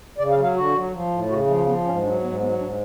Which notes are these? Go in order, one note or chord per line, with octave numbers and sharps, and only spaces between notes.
C#3 D5
F5
F#3
F5
D3 F#4
F#3
F3
A2
C#3 F#4
F3 A3
F3 B3
G#2 C#4
F#3 D4
G#2 B3
F#3 B3
G#2 D4